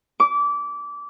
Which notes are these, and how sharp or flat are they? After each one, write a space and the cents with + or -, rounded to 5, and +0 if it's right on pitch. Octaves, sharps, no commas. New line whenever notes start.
D6 -25